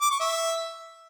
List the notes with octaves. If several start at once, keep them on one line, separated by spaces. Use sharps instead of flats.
D6
C#6
E5